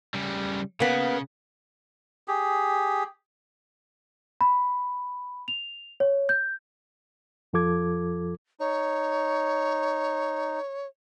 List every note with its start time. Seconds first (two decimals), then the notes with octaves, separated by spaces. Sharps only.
0.14 C#3 G3
0.80 C#3 A#3 B3
2.28 G4 G#4
4.41 B5
5.48 F7
6.00 C#5
6.29 G6
7.53 F2 F3 F4 A4 D6 G#6
8.60 D#4 C#5